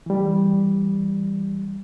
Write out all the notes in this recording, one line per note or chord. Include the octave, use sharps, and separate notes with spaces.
E3 G3